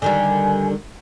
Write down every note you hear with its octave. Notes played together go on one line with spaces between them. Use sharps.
D3 D#3 G3 G#5